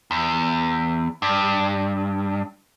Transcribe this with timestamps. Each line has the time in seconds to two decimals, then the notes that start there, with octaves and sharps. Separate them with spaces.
0.11 E2
1.22 G2